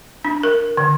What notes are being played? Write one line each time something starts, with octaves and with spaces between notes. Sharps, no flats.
D4
A#4
D3